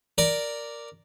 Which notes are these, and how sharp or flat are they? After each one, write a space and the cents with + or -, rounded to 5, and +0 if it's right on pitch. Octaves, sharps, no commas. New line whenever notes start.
A#4 +0 D5 -5